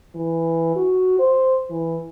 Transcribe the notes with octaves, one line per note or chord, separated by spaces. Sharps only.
E3
F#4
C5
E3